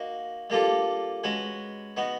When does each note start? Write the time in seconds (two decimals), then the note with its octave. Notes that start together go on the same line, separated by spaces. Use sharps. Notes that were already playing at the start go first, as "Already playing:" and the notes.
Already playing: A#3 D#4 F#4
0.50 G3 A#3 D4 F4 A4
1.24 G#3 C#4 F#4 B4
1.97 B3 D#4 F#4